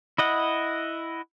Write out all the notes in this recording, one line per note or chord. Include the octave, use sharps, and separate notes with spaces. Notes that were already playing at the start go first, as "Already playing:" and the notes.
E4 D#5 F#5